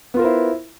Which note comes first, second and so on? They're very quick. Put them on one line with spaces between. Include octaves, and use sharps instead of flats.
B3 F4 A#4 C5 E4